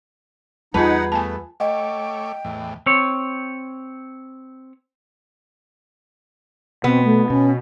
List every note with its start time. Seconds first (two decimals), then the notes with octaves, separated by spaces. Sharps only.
0.74 E2 G3 D#4 F4 G#4 B4 F#5 A5
1.12 A3 B3 G#5 A5
1.60 A3 C#5 D#5 F#5 G5 D6
2.45 E2 A2
2.86 C4 C#5
6.84 B2 B3 C4
7.04 A3
7.30 B2 C#4